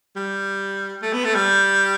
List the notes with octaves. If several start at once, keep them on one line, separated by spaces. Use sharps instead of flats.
G3
A3
B3
A3
G3